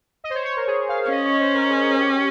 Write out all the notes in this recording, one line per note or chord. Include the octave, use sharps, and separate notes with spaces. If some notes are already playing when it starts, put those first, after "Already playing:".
D#5
C5
C#5
C#5
A#4
G#4
F5
C#5
C#4 D#5
C#5
C5
A#4
G#4
G#4
G4